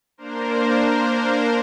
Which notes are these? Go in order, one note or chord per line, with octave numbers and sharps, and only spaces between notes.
A#3 D4 A#4 C5